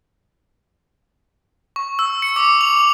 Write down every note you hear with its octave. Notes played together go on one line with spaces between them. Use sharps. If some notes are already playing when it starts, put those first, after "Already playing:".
C#6
E6
C#7
D6
F7